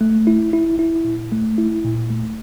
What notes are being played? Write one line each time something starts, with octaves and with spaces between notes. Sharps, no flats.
A3
E4
E4
E4
A#2
A3
E4
A#2
A3